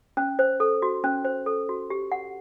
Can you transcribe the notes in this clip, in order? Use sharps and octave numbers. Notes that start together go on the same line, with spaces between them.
C#4
C5
A4
F#4
C#4
C5
A4
F#4
G4
F#5